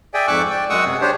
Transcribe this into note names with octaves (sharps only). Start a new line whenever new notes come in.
G#4 D5 E5 G5 G#5
F2 G#2 C#6 D6 E6 F#6
D5 G5
F#2 G#3 F#5 C#6 D#6 E6
C3 G#4
D4 G4 C5 C#5